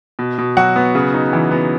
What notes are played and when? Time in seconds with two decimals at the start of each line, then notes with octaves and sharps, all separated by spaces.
0.19 B2
0.38 B2
0.57 F#3 F#4 F#5
0.76 B3
0.95 C#3
1.14 D#4
1.33 E3
1.51 B3